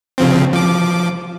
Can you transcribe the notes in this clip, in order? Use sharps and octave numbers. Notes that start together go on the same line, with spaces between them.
C#3 F3 C4
F3 D6